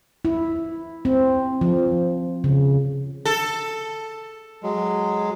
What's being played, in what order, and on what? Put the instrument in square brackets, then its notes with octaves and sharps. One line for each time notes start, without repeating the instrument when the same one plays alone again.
[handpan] E4
C4
F3
C#3
[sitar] A4
[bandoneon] F#3 G#3